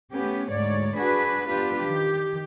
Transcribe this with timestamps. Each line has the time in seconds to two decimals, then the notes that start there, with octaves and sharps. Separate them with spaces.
0.10 A3 B3 C#4 G4
0.50 D2 G#2 C#5 D5
0.96 D4 F#4 G#4 B4
1.48 B3 D4 F4 G4 B4
1.79 D#3 G4